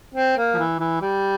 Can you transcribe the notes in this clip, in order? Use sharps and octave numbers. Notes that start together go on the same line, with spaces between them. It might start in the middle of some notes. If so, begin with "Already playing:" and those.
C4
A#3
F3
E3
E3
G3